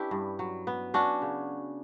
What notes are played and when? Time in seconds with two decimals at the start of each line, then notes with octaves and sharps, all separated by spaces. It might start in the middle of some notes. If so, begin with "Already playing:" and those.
Already playing: C#4 D4 E4 G4 B4
0.11 G2
0.39 F#3
0.67 B3
0.94 C#4 D4 F#4
1.22 C#3